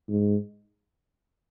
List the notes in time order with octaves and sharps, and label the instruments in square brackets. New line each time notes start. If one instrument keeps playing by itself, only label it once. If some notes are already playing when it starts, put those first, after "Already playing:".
[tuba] G#2